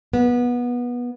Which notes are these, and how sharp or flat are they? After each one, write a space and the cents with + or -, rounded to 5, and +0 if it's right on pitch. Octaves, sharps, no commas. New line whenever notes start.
B3 -20